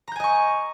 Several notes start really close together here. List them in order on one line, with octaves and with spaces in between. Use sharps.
A#5 G6 G#5 D#5 C#6